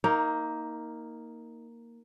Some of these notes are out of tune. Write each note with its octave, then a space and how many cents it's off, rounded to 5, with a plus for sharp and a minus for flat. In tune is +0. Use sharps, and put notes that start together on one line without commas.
A#3 +0 D#4 +20